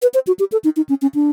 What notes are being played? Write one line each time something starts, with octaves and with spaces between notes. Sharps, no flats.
B4
C5
F#4
G4
A4
D#4
D#4
C#4
C#4
D4